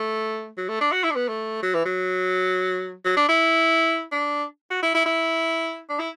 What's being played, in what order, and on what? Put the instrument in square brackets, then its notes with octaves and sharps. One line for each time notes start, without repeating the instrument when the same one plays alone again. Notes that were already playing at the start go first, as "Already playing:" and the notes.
Already playing: [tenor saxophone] A3
F#3
A3
D4
F#4
E4
D4
B3
A3
F#3
E3
F#3
F#3
D4
E4
D4
F#4
E4
E4
E4
D4
E4